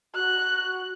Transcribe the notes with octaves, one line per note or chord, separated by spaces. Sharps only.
F#4 F#6